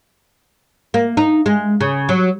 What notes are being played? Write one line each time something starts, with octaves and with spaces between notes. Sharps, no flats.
A#3
D#4
G#3
C#3
F#3